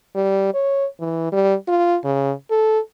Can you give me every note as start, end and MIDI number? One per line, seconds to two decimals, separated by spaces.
0.15 0.50 55
0.54 0.86 73
1.00 1.31 52
1.32 1.55 55
1.68 1.97 65
2.04 2.32 49
2.50 2.79 69